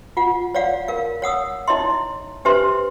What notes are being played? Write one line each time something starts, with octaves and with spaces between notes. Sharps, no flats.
F4 F#5
C#5 D5 F5 F#5
A#4 F5
C#5 F#5 D#6 E6
D#4 E4 C#5 D#5 E5 C6
D4 G4 B4 C5 E5 C6